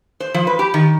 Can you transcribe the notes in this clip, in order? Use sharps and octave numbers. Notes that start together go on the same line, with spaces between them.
C5
F3
B4
G4
D#3